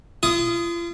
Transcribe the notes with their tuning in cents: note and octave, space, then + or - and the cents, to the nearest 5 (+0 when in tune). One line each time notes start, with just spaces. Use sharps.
F4 -40 D#6 +0